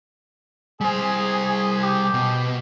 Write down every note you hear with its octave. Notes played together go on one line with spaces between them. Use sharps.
G3 G#4 C5
G4
B2